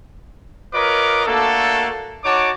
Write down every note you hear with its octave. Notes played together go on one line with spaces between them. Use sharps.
F4 A#4 B4 C#5 D#5 D6
A3 A#3 D4 F#4 A4
D#4 F#4 C#5 A5 D6